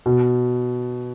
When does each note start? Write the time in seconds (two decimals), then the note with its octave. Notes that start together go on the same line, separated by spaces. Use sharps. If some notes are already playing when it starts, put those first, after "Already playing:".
0.06 B2